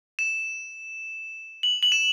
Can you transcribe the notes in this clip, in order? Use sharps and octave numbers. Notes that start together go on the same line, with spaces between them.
E7
F#7
F#7
E7